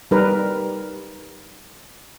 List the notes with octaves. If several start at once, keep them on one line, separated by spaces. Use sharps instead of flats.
G3 D#4 A#4 B4